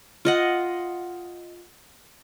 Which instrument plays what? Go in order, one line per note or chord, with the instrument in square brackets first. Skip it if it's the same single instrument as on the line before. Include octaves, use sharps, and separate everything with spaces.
[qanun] F4 D#5 F#5